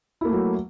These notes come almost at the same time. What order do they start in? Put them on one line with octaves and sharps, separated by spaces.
E4 A#3 A3 F#3